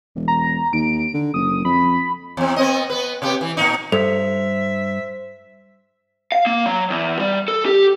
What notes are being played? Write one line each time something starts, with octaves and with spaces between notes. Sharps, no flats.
E1
A#5
D#2 D7
D3
F#1 D#6
F2 B5
E2 C4
B3 C4 D#5
B3 B4
C3 B3 G4
E3
A#2 D#3 D#4
G2 A4 C5 E5
F5
A#3
F#3
E2
G3
A4
G4